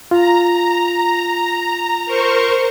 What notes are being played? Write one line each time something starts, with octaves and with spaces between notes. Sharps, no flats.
F4 A#5
A#4 C5 C#6